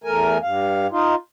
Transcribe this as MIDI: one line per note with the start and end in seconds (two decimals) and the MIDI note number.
0.04 0.38 40
0.04 0.38 57
0.04 0.38 70
0.04 0.38 80
0.42 0.87 43
0.42 0.87 77
0.91 1.15 63
0.91 1.15 65